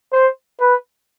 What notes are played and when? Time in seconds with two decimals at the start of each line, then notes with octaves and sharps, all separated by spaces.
0.13 C5
0.60 B4